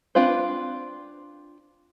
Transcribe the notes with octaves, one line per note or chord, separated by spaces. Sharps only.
C4 D4 F4 B4 C5